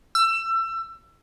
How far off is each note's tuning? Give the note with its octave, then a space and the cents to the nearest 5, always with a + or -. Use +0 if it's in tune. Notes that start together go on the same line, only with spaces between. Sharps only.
E6 +25